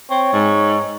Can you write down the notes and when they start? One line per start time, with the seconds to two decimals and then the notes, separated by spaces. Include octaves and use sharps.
0.10 C4 C#5
0.33 G#2